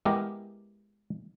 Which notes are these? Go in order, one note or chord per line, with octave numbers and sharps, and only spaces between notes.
G#3 B3 E4 G4 A#4